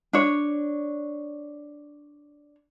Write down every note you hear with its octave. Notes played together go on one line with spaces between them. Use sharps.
D4 C#5